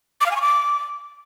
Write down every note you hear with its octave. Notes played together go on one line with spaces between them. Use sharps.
D6
F5
G#5
C#6
D6